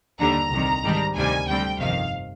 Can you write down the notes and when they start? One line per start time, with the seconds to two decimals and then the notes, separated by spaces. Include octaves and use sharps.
0.20 D#2 D3 G3 A#5
0.51 C2 C3 D#3
0.83 G#2 D#3 G3 D4
1.16 D2 C3 D#3 G3 A#3 G#5
1.47 D2 D3 G3 C4 G5
1.79 G1 F2 C3 D#3 F5